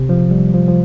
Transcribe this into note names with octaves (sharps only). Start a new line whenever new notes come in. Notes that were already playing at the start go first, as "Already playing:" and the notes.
Already playing: C3
F3
G3
F3
F3